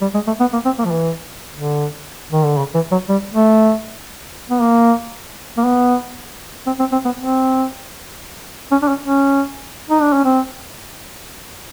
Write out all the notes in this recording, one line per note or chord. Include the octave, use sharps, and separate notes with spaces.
G3
G#3
A3
B3
A#3
C4
A#3
F3
E3
D3
D#3
D3
C#3
E3
F#3
G3
A3
B3
A#3
A#3
B3
C4
C4
C4
B3
C4
C#4
D4
C#4
C#4
D#4
D4
C#4
C4